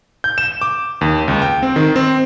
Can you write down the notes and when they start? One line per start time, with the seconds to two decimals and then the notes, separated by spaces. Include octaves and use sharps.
0.24 G6
0.38 E7
0.61 D6
1.01 D#2
1.28 C#2
1.42 G5
1.63 C4
1.76 D#3
1.96 C4